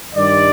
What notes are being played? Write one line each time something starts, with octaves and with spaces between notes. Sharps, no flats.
G2 D#3 G3 D5